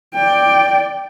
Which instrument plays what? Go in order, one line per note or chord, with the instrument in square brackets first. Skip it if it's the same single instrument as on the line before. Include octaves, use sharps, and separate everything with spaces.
[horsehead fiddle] D5 G5